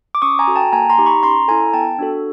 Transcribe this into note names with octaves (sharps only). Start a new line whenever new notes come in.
D6
C#4 C#6 D#6
G#5 A#5
F#4 A4
G5 A5
A#3 G#5 A#5
A#5 C6
D#4 G4
B5 C#6
C#4 A#5 C6
E4 A4 G#5 A#5
B3 G5 A5
D4 F#4 A4